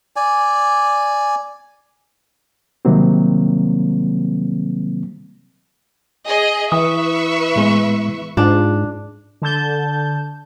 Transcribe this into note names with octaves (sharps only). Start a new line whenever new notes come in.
D5 G#5
C3 D#3 F#3 G3 A#3 C4
G#4 D#5
E3 B4 E5 C#6 D#6
A2 G#3 B3
G#2 D4 F4
D3 A5 G6